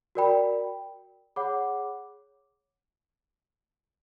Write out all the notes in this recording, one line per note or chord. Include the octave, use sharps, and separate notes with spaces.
F#4 A#4 D5 G5 B5
G#4 C#5 F#5 B5 D6